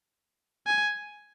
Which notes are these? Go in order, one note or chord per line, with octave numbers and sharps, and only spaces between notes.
G#5